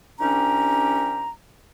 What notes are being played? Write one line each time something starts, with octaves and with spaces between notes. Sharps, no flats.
C2 C#4 D4 G4 A#5